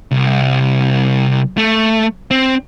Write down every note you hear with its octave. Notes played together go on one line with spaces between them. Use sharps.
C2
A3
C4